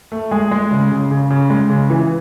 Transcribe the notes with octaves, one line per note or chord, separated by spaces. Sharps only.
A3
G#3 G#4
G#3
C#3
C#3
C#3
C#3
G#3
C#3
E3